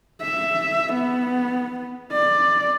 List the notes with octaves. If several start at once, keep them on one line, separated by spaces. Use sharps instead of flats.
E5
B3
D5